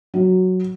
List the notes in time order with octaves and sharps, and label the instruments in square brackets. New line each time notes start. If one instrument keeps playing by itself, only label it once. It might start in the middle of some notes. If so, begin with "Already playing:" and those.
[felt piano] F#3